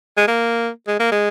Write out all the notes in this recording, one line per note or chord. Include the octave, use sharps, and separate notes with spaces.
G#3
A#3
G#3
A#3
G#3